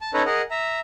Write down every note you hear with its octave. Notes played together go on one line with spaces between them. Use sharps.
A5
C#4 D#4 A4 B4 C#5 A#5
G#4 A#4 D#5 F#5
E5 A#5